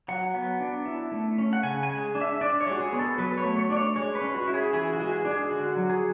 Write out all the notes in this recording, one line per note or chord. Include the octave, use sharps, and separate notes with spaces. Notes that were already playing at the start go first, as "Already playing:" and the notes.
F#3 F#5
B3
D4
E4
A3
C#4
F#5
C#3 G#5
G#5
G#3
D4
E5
D4 D5
C#5
G#3 F#4
G#4
B3
A4
F#3 B4
C#5
A3
C#5
D4 D5
C#5
G#3 C#5
B4
C#4
F#4
E4
G#4
E3 G#4
F#4
G#3
G#4
D4
G#4
D3 F#4
F#3
G#4